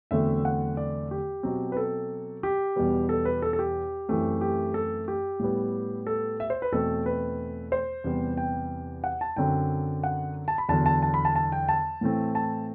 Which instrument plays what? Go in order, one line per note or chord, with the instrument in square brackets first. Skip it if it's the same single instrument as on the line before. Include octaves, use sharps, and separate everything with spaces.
[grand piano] E2 D3 F#3 A3 C4 E5
F#5
D5
G4
B2 F#3 C4
B4
A4
G4
E2 B2 G3 B3
A4
B4
A4
A4
G4
F#2 E3 A3 C4
G4
A4
G4
A2 G3 B3
A4
E5
C5
B4
E2 B2 A3 C4 A4
B4
C5
E2 C3 G3 B3
G5
F#5
A5
F#2 D3 F#3 C4 G5
F#5
A5
B5
E2 D3 F#3 A5
A5
A5
B5
A5
A5
G5
A5
A2 E3 A3 C4
A5